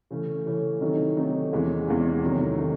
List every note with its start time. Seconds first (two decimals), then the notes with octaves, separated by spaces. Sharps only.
0.11 C#3 E3 A3 C#4
0.46 C#3 E3 A3 C#4
0.81 C3 D#3 F#3 A3 D#4
1.16 C3 D#3 F#3 A3 D#4
1.52 E2 C3 E3 G#3 C#4
1.87 E2 C3 E3 G#3 C#4
2.23 C2 C3 D#3 F#3 A3
2.57 C3 D#3 F#3 A3